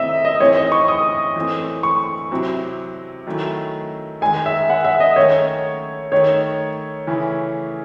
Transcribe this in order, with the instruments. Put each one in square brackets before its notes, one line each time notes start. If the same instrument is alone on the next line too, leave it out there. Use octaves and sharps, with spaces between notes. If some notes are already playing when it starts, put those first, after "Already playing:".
Already playing: [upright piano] C3 D#3 A3 C4 E4 [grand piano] D#5 E5
[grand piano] D#5
[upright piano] A2 E3 C4 D#4 [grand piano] C#5
[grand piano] D#5
C#6
D#6
[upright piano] E3 A3 C4
[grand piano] C#6
[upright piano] C3 F#3 C4 E4
D#3 F#3 A3 C#4 E4
[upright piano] D#3 G#3 D#4 [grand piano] G#5
[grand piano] E5
F#5
E5
D#5
[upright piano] D#3 A3 C#4 [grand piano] C#5
[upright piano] D#3 A3 D#4 [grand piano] C#5
[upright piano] C#3 E3 A3 C#4 E4